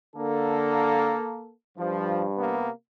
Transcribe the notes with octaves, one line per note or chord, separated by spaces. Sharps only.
D3 A#3 A4
G2 F3
C3 A#3 B3